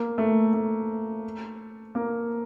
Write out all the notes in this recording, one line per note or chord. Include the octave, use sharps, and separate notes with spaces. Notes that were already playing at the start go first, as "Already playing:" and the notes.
Already playing: A#3
A3
A3
A#3